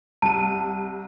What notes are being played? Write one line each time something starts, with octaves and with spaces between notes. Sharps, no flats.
C2 A5 D#7